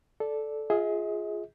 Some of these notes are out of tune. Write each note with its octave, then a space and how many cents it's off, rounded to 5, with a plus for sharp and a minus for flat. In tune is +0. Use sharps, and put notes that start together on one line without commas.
A4 -10 D5 +0
F4 +0 G#4 +0 D#5 +45